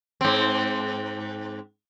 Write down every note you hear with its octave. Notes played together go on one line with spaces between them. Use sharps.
G#2 C4